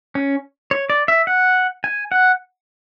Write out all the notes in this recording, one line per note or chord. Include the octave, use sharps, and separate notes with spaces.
C#4
C#5
D5
E5
F#5
G#5
F#5